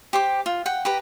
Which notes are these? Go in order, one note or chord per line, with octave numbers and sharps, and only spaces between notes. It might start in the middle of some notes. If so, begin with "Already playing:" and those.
G4 C5 D6
F4
F#5 G5
G4 B4 A#5